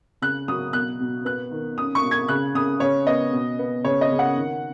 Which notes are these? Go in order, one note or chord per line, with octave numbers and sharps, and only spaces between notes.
C#3 F#6
F#3 D#6
B2 F#6
B2
B3 F#6
D#3
C#4 D#6
C#6
B2
G#6
C#3 F#6
C#3 D#6
C#3 C#5
B3 D#5
B2
B3
C#3 C#5
D#5
C#3
F#5
D#3